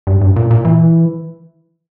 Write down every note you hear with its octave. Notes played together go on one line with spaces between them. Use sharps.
G2
G2
A#2
A#2
E3